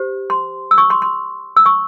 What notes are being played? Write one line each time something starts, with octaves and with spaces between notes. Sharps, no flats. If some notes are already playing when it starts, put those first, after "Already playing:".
Already playing: G4 C5
C6
E6
C#6
C6
C6
E6
C#6